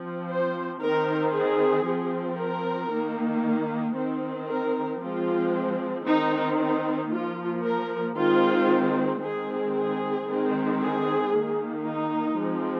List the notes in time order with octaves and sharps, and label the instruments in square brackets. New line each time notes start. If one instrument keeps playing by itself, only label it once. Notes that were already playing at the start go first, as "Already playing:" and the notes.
Already playing: [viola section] F3 C4
C5
D#3 C4 A#4
G#4
F3 C4
A#4
D#3 A#3
D#3 C4
A#4
F3 G#3 C4 F4
D#3 C4 D#4
D#4
F3 A#3 F4
A#4
D#3 G#3 C4 F4
D#3 G#3 C4 G#4
G#4
D#3 G#3 C4
G#4
D#3 A#3
D#4
F3 G#3 C4